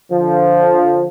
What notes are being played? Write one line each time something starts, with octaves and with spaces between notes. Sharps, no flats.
D3 F3